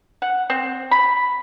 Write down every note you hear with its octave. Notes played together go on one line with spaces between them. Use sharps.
F#5
C4
B5